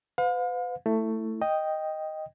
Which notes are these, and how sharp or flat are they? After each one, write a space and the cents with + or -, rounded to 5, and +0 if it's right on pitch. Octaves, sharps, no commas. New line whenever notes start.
B4 +40 F5 +40
A3 +15 E4 +0
D#5 +0 G5 +0